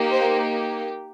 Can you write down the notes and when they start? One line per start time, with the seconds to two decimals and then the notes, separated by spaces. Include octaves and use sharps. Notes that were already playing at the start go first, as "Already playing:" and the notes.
Already playing: A#3 D#4 G4
0.11 C5